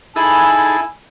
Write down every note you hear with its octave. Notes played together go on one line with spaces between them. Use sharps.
D#4 E4 G#4 A4 G#5 B5 E6